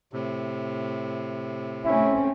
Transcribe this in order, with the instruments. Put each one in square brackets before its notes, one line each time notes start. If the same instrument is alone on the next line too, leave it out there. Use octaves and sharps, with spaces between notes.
[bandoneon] A2 C3
[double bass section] A3 C4 C#4 [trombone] E4